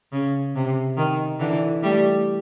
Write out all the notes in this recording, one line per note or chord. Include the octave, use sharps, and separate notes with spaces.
C#3
C3
D#3
D3 E3
G3 A3